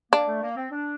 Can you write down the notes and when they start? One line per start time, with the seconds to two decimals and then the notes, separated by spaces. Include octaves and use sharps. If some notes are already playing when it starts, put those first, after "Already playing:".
0.12 A#3 D4
0.28 A3
0.42 A#3
0.56 C4
0.71 D4